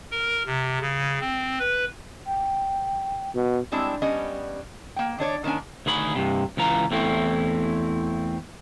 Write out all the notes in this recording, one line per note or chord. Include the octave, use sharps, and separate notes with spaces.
A#4
C3
C#3
C4
B4
G5
B2
G3 G#3 C4 D4 E4
G3 B3 C#4 D#5
A#3 G5
D#3 D4 C#5 D5
D#3 A#3 C#4 D4 G#5
D2 D#3 G#4 B5
G2 C3
C#2 E3 F4 A#5
E2 A3 C4 E4